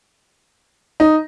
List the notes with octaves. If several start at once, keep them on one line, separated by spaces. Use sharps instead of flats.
D#4